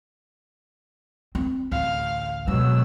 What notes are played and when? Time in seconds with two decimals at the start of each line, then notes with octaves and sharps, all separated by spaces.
1.35 C4
1.72 A1 D2 F5
2.48 B2 F#3 G#3 E6